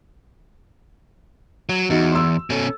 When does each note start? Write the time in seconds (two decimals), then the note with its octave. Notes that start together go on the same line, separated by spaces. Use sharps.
1.69 F#3
1.90 E2 D#4 F#4
2.12 C6 E6
2.50 B2 C#4 A4